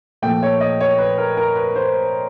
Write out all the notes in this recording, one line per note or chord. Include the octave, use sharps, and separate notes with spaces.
A#2 F3 A3 G5
C#5
D#5
C#5
B4
A#4
A#4
B4
C5